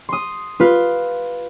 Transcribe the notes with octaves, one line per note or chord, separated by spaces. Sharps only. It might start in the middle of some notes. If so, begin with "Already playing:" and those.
C6 D#6
F4 B4